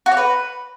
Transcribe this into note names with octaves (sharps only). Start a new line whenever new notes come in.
F#4
C#5
B4